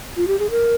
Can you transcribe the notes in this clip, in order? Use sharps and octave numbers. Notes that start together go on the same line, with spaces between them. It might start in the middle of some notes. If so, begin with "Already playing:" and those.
F4
G4
G#4
A#4